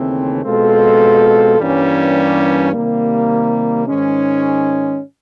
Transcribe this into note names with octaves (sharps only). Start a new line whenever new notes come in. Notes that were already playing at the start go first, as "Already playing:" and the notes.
Already playing: D#2 C#3 E3 A3 C4
B2 G#3 C4 F4 A4
G2 E3 G3 A#3 C#4
C3 D#3 G3 A#3
G#2 D#3 G#3 C#4